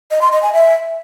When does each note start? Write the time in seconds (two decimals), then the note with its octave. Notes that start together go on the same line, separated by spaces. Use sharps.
0.11 D#5
0.21 C6
0.32 D#5
0.43 G#5
0.53 E5